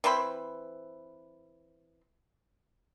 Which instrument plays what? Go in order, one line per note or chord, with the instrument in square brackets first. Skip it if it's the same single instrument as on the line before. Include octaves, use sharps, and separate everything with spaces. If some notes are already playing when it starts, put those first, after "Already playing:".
[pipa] E3 C4 C5 B5